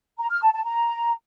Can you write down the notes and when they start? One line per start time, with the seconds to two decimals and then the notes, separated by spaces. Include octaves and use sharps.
0.19 A#5
0.30 F6
0.42 A5
0.53 A5
0.65 A#5